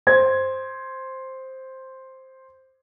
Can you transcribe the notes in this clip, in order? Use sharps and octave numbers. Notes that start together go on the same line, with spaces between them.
C5 G#6